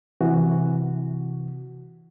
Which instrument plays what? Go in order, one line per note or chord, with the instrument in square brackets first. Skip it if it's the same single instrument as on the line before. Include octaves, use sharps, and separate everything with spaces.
[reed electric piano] C3 E3 F#4